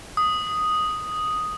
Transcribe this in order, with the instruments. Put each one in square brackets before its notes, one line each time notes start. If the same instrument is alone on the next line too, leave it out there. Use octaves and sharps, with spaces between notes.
[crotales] D#6